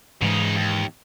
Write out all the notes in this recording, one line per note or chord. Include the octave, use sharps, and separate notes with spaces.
G#2 C#3 E3 G#3 D#4
D#2